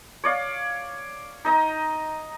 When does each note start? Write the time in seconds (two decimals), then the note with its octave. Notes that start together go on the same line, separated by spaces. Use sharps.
0.24 C#5 D5 F5
1.45 D#4 D#5 A#5